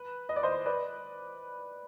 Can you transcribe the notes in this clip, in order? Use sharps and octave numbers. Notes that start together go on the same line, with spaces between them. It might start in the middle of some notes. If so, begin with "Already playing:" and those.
Already playing: B4
D#5
D5
C5 D#5
B4 D5